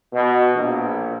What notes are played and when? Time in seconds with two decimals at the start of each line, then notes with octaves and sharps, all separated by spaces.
0.13 B2
0.54 A#1